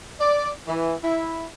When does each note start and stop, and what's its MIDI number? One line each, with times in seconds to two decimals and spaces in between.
0.20 0.49 74
0.68 0.96 52
1.04 1.47 64